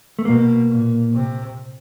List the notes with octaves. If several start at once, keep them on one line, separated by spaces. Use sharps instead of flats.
A3
B2 A#3
A#2
C3